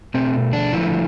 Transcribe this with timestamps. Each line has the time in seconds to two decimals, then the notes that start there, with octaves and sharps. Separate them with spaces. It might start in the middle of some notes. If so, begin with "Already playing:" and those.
0.14 B2 A3 C4
0.53 D4
0.73 D3 F3 A3 E4